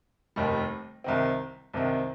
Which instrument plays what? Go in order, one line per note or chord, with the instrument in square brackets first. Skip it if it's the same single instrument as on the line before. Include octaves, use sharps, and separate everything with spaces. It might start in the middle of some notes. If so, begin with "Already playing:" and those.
[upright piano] F1 D#2 D#3 G3
C2 C3 D#3 C4
C2 C3 D#3 C4